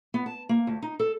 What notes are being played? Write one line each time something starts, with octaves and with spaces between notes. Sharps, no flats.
B3
A5
A#3
D2
D#4
A4